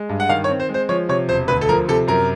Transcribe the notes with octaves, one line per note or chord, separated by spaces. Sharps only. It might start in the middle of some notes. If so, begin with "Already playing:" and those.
Already playing: G#3
G2
F#5
D#3 F5
C#5
C4
C5
G#3
C5
F3 C#5
C3 C#5
E1 C5
D2 B4
A4
F3 A#4
C3 A4
F#2 A#4